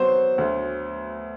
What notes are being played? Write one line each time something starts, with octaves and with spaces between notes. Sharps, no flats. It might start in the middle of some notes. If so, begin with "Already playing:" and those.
Already playing: F#3 B3 C5
D2